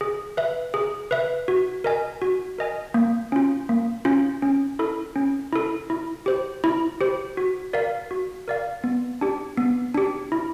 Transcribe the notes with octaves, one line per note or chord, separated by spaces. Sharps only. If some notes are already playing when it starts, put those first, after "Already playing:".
G#4
B4 E5
G#4
B4 E5
F#4
A#4 D#5 G#5
F#4
A#4 D#5 G#5
A#3
C#4 F4
A#3
C#4 F4
C#4
E4 A4
C#4
E4 A4
E4
G4 C5
E4
G4 C5
F#4
A#4 D5 F5
F#4
A#4 D5 F5
B3
D4 G4
B3
D4 G4
E4